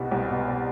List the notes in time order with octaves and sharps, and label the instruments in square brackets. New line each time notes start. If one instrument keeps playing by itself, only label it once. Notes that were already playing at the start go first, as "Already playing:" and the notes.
Already playing: [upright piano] C2 B2 G3
C2
B2
G3